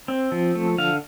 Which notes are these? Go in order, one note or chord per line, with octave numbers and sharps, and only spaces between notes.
C4
F3
A3
D3 F5